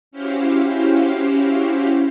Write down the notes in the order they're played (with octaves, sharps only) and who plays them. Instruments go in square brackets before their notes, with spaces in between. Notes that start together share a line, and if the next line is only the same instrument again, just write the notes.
[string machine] C#4 E4 F#4 G4 C5 F5